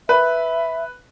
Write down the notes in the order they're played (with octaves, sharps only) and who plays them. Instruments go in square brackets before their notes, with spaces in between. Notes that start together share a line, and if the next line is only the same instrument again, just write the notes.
[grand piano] B4 [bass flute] E5